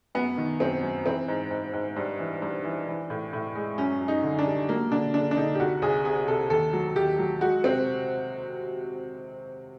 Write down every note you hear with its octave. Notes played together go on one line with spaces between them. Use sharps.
F#2 B3
D#3
F#2 C4
F#2
E3 C4
G#2
G#2
G#2
G2
E3
G2
E3
E3
A2
A2
G#3
F#2 C#4
F#2
D#4
D3
D4
G3
F#3 A#3
D3 D4
D3 D4
D4
D3 D#4
G4
C2 F#4
C2 G#4
C3 G#4
C3 A4
D#2 A4
F#3
D#2 G4
F#3
G#3 F#4
C3 C4